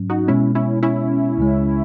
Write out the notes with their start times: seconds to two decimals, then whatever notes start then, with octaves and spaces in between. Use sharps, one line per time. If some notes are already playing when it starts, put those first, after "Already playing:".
Already playing: G#2 F#3 C#4
0.10 D#4 F#4
0.27 B2 G#3 B3 C#4 E4
0.55 C#4 E4
0.83 C#4 E4
1.38 C#2 C#3 G#3